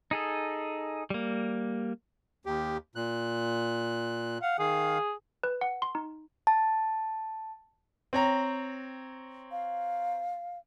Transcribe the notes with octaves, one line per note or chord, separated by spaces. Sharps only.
D#4 G#4 A4
G3 A#3
D#2 G4
A#2 F#6
F5 F#5
D#3 G#4 F5
B4
F#5
C6
D#4
A5
C4 C#5 A#5
F5